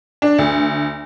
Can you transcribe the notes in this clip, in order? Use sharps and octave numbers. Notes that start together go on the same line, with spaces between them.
D4
D2